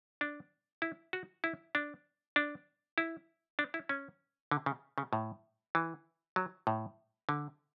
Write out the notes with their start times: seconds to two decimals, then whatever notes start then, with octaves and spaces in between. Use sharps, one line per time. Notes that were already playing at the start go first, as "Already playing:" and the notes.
0.21 D4
0.82 E4
1.13 F#4
1.44 E4
1.75 D4
2.36 D4
2.98 E4
3.59 D4
3.74 E4
3.89 C#4
4.51 D3
4.66 C#3
4.98 C#3
5.13 A2
5.75 E3
6.36 F#3
6.67 A2
7.29 D3